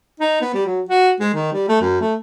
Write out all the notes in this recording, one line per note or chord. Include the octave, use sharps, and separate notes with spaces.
D#4
B3
G3
F#3
F#4
G#3
D#3
G3
A3
F#2
A3